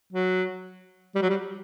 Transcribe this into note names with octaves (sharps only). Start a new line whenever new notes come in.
F#3
G3
F#3
G3